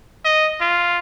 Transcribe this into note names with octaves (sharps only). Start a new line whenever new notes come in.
D#5
F4